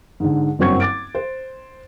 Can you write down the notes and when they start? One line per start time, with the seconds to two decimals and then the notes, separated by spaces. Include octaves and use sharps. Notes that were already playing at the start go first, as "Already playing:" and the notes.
0.20 G#2 D3
0.59 F#1 G2 F#3 C4 C#6 G#6
0.80 D6 A6 D7
1.15 C5